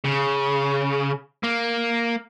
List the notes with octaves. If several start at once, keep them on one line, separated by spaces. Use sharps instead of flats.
C#3
A#3